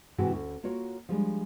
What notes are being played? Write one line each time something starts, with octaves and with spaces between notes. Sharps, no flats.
G#2 C3 E3 G#3 E4 F#4
D2 C#4
A#3 F4 F#4 C#5
F3 G3 G#3 D4